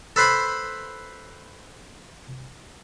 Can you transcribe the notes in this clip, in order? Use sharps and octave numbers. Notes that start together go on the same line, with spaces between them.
A4 B4 C5 B5